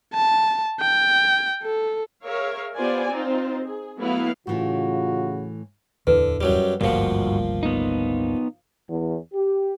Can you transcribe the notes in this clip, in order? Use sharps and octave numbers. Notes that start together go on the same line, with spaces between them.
A5
G5
A4
G#4 A#4 C#5 E5 F5
B3 F4 G4 C5 D5 G#5
C4 D#4 F4 C5
G#4
F#3 A3 B3 E4 F5
A2 C#3 E3 A3 F4 F#4
D1 E2 D3 E3 B4
F#2 F#3 G3
G#1 D2 G2 A#2 F3 G3 F#4
B3 D#4
E2
G4